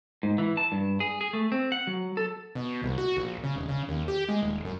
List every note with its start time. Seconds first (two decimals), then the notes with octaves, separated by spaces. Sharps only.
0.23 G#2
0.38 E3
0.57 A5
0.72 G2
1.00 G#4
1.21 G#4
1.33 A3
1.52 C4
1.72 F#5
1.87 F#3
2.17 A4
2.55 B2
2.83 C2
2.98 F#4
3.17 A#1
3.44 C#3
3.56 D#1
3.69 C#3
3.88 D#2
4.08 G4
4.29 G#3
4.43 D#1
4.65 F#2